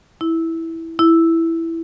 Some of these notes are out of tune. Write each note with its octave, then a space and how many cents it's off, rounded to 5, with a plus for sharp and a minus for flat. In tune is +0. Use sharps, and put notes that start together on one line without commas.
E4 -10
E4 +0